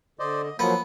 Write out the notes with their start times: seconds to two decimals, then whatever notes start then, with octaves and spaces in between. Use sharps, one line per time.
0.19 D3 C5 D5 D#5
0.44 D#5
0.59 F3 F#3 A#3 B3 F4 A4 F#5